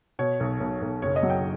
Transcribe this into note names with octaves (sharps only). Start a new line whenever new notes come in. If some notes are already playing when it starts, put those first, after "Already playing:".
B2 C#5
B1
B1
B1
F#1 C#5
D#5
F#3
G5